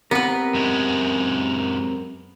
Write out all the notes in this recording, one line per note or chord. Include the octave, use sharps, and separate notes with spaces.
B3 C4 G4 A#4 B4
F#2 G#3